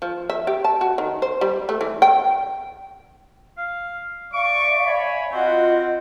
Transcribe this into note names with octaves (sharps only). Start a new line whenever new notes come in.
F3
E5
G4
A5
F#4
D#3
C5
G3
A3
E3
G5
F5
D5 E5 F5 C#6 D6
C#5 G#5 B5
C4 F4 F#4 D#5 F#5